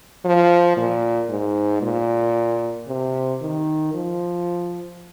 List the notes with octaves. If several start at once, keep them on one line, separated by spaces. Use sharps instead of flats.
F3
A#2
G#2
A#2
C3
D#3
F3